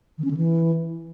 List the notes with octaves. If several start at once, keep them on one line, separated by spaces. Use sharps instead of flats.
D#3
C#4
D3
E3